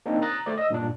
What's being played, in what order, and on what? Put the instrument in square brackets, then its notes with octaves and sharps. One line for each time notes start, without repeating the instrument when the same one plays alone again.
[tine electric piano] A#3 C4 D4 D#4
A#5 D#6 F#6 A6 A#6
A3 C5 D5
D#5 E6
G2 A#2 D4